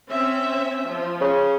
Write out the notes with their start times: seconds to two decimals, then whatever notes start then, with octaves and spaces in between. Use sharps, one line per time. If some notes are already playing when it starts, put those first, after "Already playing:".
0.11 C4 C#4 E5
0.89 F3
1.21 C#3 C#4